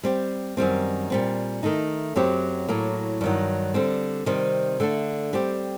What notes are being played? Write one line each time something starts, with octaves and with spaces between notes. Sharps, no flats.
G3 C4 G4
F#2 D#3 G3 C4
A#2 G3 C4
D#3 A3 D#4
F#2 F#3 C4 G4
A2 F#3 A#3
G2 D#3 F#3
D3 G3 C4
C3 D#3 G3 C4
D3 A3 D4
G3 C4 G4